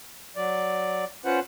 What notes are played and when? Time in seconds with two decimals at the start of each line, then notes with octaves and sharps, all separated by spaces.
0.36 F#3 D5
1.25 C#4 F4 B4 C5 F#5